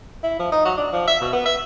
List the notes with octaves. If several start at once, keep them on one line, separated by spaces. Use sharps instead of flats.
E4
F3
D#4
F#3
D4
F3
E5
B2
B3
E5